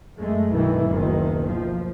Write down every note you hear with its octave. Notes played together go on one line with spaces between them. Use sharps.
F#2 G#3 A3
B1 G2 B2 D#3 E3
F#1 D2 B2 D#3
F3